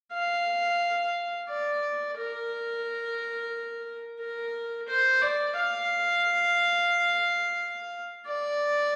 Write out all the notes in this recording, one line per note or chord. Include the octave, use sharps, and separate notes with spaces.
F5
D5
A#4
A#4
C5
D5
F5
D5